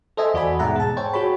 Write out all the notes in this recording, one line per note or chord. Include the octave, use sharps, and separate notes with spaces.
A4 C5 D#5 E5 G#5
E2 F#4 D5 G#5 B5
G#2 B2 G#3 E5 F#5 A#5
G#4 A5
C5 C#5 G5
F#4 G#4 C#5 B5